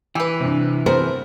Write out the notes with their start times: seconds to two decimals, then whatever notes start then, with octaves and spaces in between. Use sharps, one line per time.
0.15 E3 G4 B4 G#5 E6
0.40 G2 C3
0.86 A3 B3 C4 G#4 A#4 C5